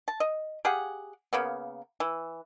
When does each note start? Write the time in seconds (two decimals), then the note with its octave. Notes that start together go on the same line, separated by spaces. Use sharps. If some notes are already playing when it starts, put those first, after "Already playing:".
0.08 A5
0.20 D#5
0.65 G4 G#4 F5 F#5
1.33 C#3 A#3 B3
2.00 E3